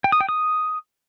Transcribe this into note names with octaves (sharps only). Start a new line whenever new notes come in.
G5
D#6
G5
D#6